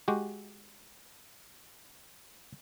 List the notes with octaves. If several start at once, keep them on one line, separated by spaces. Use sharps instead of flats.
G#3 F#4 G4